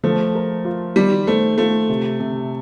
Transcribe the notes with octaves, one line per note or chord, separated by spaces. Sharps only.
F3 A3
A#4
F4
D#3 G3
A3 C5
A3 F4
C3
C3